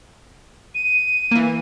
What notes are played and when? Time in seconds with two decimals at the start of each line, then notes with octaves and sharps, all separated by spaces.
0.75 D#7
1.31 E3 A#3